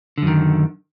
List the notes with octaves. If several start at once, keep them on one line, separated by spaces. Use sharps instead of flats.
F#2 D3 D#3